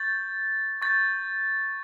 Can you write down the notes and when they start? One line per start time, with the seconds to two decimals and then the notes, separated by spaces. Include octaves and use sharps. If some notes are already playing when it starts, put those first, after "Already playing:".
Already playing: C#6 G6 A6
0.82 C#6 G6 A6